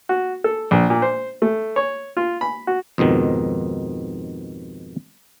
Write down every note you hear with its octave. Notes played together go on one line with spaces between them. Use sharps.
F#4
A4
A#1
A#2
C5
A3
C#5
F4
B5
F#4
F2 G#2 B2 D#3